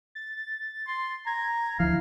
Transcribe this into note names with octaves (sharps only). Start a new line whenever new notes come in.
A6
C6
A#5 G#6
D2 F3 E4 F5